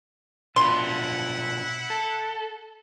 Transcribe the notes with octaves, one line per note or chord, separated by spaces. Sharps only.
B2 D4 E4 F4 F#5 C6
A4